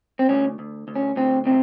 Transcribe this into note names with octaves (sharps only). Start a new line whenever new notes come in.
C4
D2 C#4
D2
D2
C#4
D2 C4
C3 C4